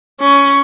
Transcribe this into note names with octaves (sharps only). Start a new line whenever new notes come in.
C#4